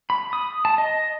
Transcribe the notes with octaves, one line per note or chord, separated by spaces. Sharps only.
B5
D#6
A5
D#5